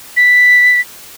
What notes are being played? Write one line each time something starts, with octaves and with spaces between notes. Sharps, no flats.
B6